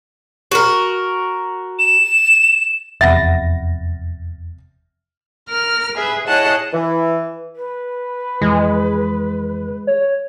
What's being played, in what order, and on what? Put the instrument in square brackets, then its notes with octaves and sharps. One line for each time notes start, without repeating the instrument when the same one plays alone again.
[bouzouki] F#4 A#4
[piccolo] E7
[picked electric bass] F1 E2 C3 [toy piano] E5 F#5 B5 [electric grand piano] A6 A#6
[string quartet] A#4 F6
G#4 B4 E5
E4 G#4 C#5 D#5 F#5 A5
[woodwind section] E3
[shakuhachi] B4
[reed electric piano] F2 E3 [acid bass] G#3
[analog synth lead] C#5